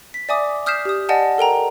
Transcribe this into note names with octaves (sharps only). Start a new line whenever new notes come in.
B6
D5 E5 G#5 D6 D#6
D#6 F6 G6 B6 C7 E7
G4 D#6
D5 D#5 F#5 G#5 A5
A4 A#4 G5 A#5